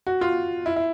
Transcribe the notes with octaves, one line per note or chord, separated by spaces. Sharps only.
F#4
F4
E4
E4